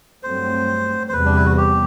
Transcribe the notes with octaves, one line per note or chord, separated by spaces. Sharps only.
G2 F#3 A3 C4 C5
C5
E2 C3 G3 B4
D4
E4
F#4
G4